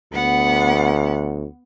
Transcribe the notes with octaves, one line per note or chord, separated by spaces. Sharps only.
D2 B3 F#5